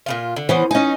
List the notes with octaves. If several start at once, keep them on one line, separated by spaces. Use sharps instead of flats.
A#2 C#3 F4
D3
E3 B3 C#4 C5
C#4 D#4 D#5 G#5